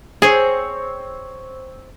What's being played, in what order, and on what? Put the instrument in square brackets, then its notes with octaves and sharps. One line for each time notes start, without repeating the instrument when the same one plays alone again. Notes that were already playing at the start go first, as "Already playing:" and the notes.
[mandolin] C4 C5 C#5 [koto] G#4